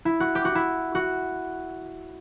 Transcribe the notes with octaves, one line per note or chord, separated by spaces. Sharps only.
E4
F#4
G4
F#4
E4
F#4